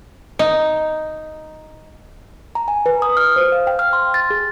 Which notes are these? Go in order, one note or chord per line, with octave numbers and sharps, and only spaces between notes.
D#4
A#5
G#5
B4
D#6
F6
C5
F5
G5
F6
C6
A6
G#4